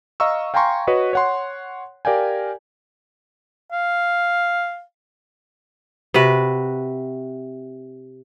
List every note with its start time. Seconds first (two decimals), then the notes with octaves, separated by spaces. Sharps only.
0.20 D#5 F5 A#5 C#6 E6
0.54 F5 G5 G#5 A#5 C6 C#6
0.87 F#4 B4 C#5 D#5
1.13 C#5 F#5 C6
2.05 G4 A#4 D5 F5 G5 G#5
3.72 F5
6.14 C3 F#4 B4